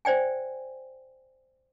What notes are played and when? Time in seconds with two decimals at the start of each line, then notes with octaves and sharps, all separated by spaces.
0.05 C5 D5 G5 G#5